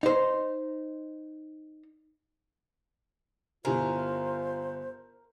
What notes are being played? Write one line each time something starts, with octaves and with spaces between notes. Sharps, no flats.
D#4 C5
G1 E4 F4 A#4 C5 G#5